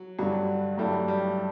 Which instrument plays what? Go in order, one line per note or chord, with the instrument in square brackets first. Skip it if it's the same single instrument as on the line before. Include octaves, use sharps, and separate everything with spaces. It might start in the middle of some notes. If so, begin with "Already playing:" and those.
Already playing: [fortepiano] F#3
[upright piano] G2 D3 G3 [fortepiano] F#3
[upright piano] G2 F#3 A3 E4 [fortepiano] G3
[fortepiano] G3